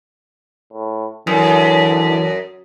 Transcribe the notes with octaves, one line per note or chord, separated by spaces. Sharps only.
A2
F#2 D3 E3